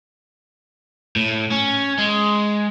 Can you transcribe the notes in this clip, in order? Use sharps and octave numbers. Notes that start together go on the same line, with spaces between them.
A2
C#4
G#3